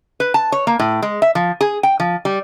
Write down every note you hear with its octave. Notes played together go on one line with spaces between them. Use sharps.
B4
A5
C#5
A#3
A2
G#3
E5
F3
G#4
G5
F3
G3